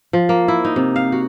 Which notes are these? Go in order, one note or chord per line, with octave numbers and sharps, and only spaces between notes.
F3
A#3
E4
D#4
C3
F5
F#4